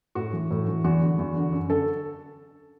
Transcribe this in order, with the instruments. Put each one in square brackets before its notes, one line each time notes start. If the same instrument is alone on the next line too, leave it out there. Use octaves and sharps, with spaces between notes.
[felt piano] A2 F#4
E3
A2
E3
E2 F#4
D3
E2
D3
F#2
D3 A4